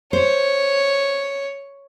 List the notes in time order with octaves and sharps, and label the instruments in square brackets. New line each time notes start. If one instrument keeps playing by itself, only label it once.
[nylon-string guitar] C5 [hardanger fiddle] C#5